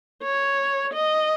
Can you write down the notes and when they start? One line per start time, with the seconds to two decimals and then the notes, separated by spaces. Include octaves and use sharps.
0.23 C#5
0.93 D#5